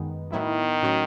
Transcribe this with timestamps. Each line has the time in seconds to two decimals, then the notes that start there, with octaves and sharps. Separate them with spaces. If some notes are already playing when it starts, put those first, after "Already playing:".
Already playing: F#2 D#3 G#3 B3 D#4
0.32 A2 D#3 F#3 B3 E4
0.83 A2 F#3 C#4 F#4